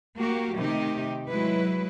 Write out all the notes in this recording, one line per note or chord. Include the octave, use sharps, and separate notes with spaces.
A#3 F#4 G4
C3 D#3 A3 D#4 G4
F#3 G#3 E4 B4